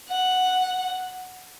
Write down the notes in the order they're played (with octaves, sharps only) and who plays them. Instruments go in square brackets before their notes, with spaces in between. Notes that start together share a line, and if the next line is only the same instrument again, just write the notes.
[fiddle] F#5